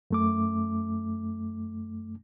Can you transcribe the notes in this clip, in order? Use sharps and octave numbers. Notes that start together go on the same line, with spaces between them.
F#2 A3 D6